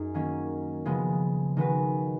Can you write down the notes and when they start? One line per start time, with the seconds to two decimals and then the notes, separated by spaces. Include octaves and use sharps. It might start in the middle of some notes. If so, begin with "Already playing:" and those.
Already playing: F#2 D#4 G#4
0.14 D#3 F#3 A#3 C#4
0.85 C#3 F3 G#3 B3
1.57 D#3 G#3 B3 F#4 B4